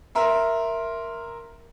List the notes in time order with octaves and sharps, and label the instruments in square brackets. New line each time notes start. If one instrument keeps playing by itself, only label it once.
[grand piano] A#4 E5 C6